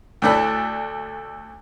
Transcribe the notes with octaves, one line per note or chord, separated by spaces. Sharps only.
D2 A2 D4 A4 B5